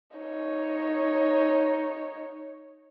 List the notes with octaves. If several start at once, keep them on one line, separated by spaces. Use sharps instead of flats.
D#4 C#5